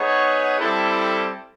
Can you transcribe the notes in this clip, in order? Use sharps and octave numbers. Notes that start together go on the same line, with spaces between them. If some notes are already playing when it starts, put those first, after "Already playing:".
Already playing: B3 D#4 G#4 C#5 F#5
G3 C4 E4 A4